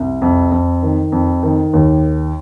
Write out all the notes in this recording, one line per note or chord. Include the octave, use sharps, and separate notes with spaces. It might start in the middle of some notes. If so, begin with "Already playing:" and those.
Already playing: C2
F2
F2
D#3
F2
D#3
D#2